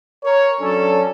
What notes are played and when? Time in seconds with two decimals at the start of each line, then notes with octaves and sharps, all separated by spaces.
0.24 A#4 C#5
0.59 F#3 C#4 D4 A4